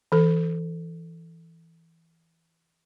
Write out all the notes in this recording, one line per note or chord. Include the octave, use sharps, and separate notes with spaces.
E3 A4